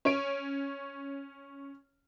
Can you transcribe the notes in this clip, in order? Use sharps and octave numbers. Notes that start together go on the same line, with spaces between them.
C#4 C#5 D7